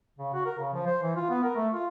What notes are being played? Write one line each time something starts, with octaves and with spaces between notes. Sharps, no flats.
C#3
F#4
A#4
C#3
F3
C5
E3
F4
B3
A#4
A3
F4